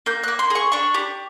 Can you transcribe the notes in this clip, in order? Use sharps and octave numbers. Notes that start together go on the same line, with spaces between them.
A#3 G6
A#3 F#6
C6
G#4
C#6
D4 C#6
G4